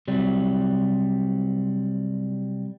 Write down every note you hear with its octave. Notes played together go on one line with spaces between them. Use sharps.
C3 F#3 G3